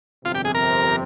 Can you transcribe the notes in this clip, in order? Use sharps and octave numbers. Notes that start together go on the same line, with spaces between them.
G1 F2 C3 F4
G4
G#4
A#4